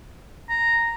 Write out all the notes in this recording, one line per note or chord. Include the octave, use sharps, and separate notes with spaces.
A#5